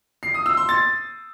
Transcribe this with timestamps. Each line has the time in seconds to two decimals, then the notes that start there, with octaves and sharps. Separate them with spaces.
0.23 C7
0.34 D#6
0.46 E6
0.57 C6
0.69 A6